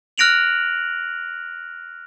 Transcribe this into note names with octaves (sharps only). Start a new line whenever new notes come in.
F6 F#6 A#6 D7 F7 F#7